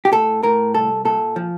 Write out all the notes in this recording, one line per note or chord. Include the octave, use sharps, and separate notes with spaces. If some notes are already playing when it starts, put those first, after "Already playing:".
G4
A2 A4
A2 A#4
C2 A4
A#2 A4
F3